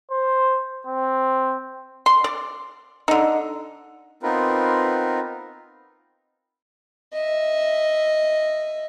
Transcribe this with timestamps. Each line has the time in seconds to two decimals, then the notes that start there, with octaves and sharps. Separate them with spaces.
0.11 C5
0.87 C4
2.06 C6
2.24 D5
3.08 D3 D#4
4.23 B3 C4 D#4 F4 A#4 B4
7.13 D#5 E5